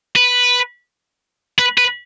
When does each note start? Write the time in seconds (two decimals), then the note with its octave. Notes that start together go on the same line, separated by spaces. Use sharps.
0.16 B4
1.59 B4
1.78 B4